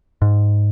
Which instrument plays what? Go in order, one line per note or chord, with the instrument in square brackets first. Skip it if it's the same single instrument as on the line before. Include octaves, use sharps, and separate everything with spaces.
[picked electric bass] G#2